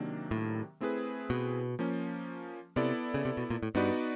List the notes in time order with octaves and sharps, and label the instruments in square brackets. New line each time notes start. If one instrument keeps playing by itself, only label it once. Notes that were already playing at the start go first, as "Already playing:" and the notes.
Already playing: [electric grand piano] C3 D#3 F#3 A#3 D4
[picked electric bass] A2
[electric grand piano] A3 C4 E4 G#4 B4
[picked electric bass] B2
[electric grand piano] F3 A#3 C#4
[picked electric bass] C3 [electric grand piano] B3 E4 A4 D5
[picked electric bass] C#3
C3
B2
A#2
A2
[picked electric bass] G2 [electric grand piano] B3 D#4 F#4 B4 D5